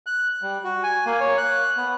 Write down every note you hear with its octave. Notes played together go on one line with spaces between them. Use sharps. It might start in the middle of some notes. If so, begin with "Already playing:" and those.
F#6
G3
F#4
G#5
A#3
C#5
F#6
B3